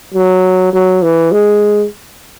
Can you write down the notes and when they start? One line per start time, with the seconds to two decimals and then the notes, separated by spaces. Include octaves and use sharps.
0.14 F#3
0.73 F#3
1.02 E3
1.32 G#3